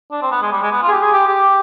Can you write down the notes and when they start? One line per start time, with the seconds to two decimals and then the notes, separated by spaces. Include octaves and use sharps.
0.11 D4
0.22 C4
0.31 B3
0.42 G#3
0.52 G3
0.62 G#3
0.72 B3
0.82 F4
0.88 G#4
0.91 G4
1.02 G#4
1.12 G4
1.27 G4